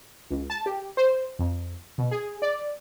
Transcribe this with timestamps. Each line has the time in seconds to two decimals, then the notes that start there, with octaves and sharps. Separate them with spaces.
0.31 C#2
0.50 A5
0.66 G4
0.97 C5
1.39 F2
1.98 B2
2.11 G#4
2.42 D5